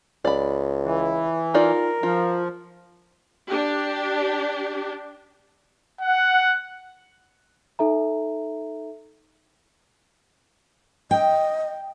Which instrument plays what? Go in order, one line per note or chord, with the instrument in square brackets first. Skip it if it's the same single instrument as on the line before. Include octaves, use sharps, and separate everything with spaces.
[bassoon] C#2 [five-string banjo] D5 B5
[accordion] E3
[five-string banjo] D#4 F4 D5 [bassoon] A#4
[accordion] F3 [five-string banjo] F4
[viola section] D4 G4
[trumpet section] F#5
[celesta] D#4 A4 E5 A#5
[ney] D#5 [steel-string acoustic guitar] G5